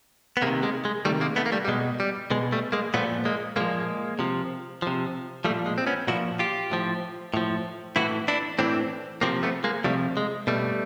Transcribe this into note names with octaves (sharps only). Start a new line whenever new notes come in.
B3
C3 D#3 G#3 A#3
G#3 A#3
G#3
C3 D#3 G3 A3
G#3 A#3
A3 B3
A#3
G3 A3
G3
B2 G#3
G3
B2 G#3
G3 A3
G#3 A#3
A#2 F3 A3 B3
G#3 A#3
A#2 F3 G#3 A#3
C3 F3
C3 F3
F3 G3 A3
A#2
G#3
C4
B3 C#4
A#2 F3 E4 F#4
F4 G4
A2 F3
A2 F3
A2 E3 E4 F#4
D4 E4
A2 E3 C4 D4
C3 F3 A#3 C4
A3 B3
G#3 A#3
C3 F3 G3 A3
G#3
B2 G3 A3